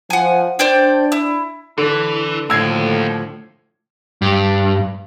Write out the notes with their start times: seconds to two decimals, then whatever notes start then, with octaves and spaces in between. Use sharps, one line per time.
0.10 F3 F#5 G#5
0.59 D4 C5 D5 G5
1.12 E4
1.78 D3 E3 D4
2.50 D#2 A2 D3 F3 E6 G#6 C7
4.22 G2